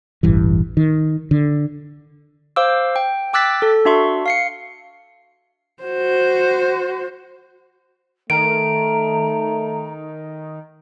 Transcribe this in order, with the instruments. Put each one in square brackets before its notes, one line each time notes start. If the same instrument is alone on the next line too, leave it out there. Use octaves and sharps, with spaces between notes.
[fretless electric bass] E1 A1 G2 E3
D#3
D3
[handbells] C5 F5 D6 E6
G5
G5 D6 E6 F#6 A6 B6
A4
D4 F#4 E5 C6 C#6
F5 C7 C#7
[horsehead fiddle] F#4 C5
[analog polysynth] D#3 [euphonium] A3 [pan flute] A#5 [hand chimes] D7